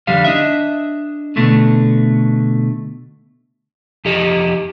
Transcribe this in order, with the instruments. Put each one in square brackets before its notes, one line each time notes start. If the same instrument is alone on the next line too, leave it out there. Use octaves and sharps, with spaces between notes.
[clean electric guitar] F2 D3 G3 F5
D4 D#5 E5
B2 D3 A3
[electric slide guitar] F2 G4 D#5